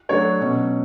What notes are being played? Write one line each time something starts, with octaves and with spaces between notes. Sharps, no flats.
D3 F#3 A3 D4 C#5
B2 F#3 C#4